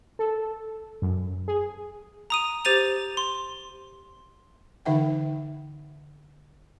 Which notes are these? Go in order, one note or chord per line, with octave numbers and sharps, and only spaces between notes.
A4
F#2
G#4
A#5 D#6 D#7
G4 C5 A6 D#7 F7
C6
D3 E3 D#4 E5 F#5 G5